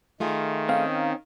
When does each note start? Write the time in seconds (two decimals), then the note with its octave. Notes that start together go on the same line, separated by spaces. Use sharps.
0.20 D#3 A3 F4 G#4
0.69 C4 C#4 D#4 F5